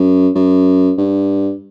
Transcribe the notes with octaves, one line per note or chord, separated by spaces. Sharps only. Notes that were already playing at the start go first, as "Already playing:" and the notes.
Already playing: F#2
F#2
G2